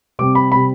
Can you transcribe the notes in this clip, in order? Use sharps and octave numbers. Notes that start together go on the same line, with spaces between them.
C3 G3 C4 D6
B5
C3 G3 C4 B5